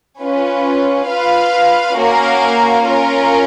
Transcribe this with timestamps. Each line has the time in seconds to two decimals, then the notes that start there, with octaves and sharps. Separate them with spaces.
0.21 C#4 F4 B4
1.09 F4 B4 F5
1.96 A#3 C#4 F#4 A#4 F5
2.85 C#4 F4 A#4